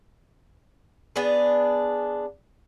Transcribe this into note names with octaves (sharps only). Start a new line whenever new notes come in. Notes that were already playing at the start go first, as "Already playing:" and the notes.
B3 D4 G#4